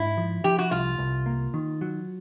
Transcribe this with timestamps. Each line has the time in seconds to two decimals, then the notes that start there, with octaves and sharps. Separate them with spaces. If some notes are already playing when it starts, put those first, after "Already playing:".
Already playing: G#2 E4
0.17 F3
0.44 F3 G4
0.58 F#4
0.71 C2 F4
0.99 C2
1.26 A#3
1.54 D#3
1.81 F#3